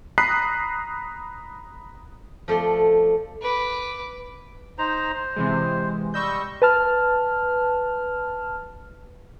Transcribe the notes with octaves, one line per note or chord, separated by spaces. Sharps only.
A#5 B5 D#6 F#6 B6 C7
F3 A3 D5 C6
B4 D6
D#4 C5 A#5
C5
C3 E3 G#3
G3 D#5 C#6 E6 G6
B4 A5 F6